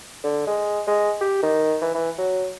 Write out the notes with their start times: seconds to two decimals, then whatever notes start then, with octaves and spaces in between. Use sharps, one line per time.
0.24 D3
0.47 G#3
0.87 G#3
1.21 G4
1.43 D#3
1.82 E3
1.95 E3
2.18 F#3